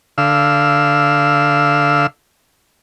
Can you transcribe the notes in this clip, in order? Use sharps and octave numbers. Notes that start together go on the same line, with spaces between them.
D3 F5 E6